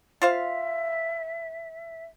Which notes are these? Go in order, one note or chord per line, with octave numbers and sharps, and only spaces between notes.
F4 C5 E5 F5